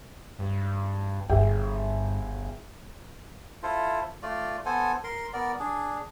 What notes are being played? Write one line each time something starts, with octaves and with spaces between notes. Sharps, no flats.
G2
G1 G2 G#4 E5 G5
E4 F4 A4 C5
A3 F4 D5
B3 A4 C5 G#5
A#4 C6
B3 A#4 D5
D4 G#4